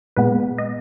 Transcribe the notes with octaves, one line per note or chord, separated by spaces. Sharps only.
A#2 G#3 B3 B4
D#5